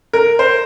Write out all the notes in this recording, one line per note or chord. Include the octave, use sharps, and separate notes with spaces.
A#4
C5